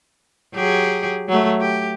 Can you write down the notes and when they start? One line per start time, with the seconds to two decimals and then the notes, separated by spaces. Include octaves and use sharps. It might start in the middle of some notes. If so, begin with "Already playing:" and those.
0.54 F#3 G4 G#4
1.29 F#3 A3
1.60 G4